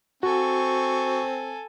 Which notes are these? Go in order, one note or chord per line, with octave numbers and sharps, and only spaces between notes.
C4 F#4 A4 G#5 C#6